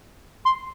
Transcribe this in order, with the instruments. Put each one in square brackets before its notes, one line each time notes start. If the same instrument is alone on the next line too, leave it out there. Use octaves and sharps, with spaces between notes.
[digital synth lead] C6